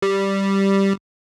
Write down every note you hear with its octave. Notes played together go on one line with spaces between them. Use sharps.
G3